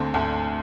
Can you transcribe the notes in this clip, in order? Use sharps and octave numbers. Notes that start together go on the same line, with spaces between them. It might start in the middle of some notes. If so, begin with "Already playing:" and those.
Already playing: D2 D3 A3 C4
D2 D3 A3